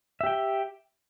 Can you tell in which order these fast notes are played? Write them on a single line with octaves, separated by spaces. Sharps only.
E5 G4 G5